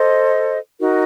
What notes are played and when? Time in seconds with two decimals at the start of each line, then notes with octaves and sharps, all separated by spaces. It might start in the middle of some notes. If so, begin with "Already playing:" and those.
Already playing: A4 C5 D#5
0.78 D#4 F#4 A#4